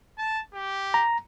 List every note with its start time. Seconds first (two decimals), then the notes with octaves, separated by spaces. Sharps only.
0.18 A5
0.54 G4
0.94 A#5